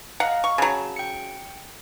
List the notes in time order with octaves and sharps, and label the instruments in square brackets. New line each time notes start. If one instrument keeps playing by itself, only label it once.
[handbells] D#5 F5 A#5 [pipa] F#5
[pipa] C#6
[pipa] C#3 F#3 [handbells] A5
[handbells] G5 C#7